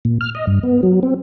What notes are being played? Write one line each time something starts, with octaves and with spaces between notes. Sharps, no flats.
A#2
F6
D#5
G2
B3
F#3
C4